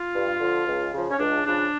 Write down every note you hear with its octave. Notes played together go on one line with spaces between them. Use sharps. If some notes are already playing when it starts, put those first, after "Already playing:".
Already playing: F4
G2
D3 F3
C#2
C#3 F3
C#4
C#2 D4
C#3 F3 D4